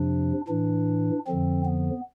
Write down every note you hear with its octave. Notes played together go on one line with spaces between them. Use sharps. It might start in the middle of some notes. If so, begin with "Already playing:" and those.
Already playing: F2 C3 F3 D4
A2 E3 D4
F2 D3 F3 C4
B3